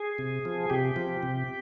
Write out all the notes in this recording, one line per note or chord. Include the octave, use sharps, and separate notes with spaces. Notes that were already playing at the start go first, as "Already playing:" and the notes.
Already playing: G#4
C3
F3
C3 G4
F3
C3